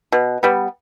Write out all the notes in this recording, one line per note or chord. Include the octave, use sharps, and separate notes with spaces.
B2
G3 B3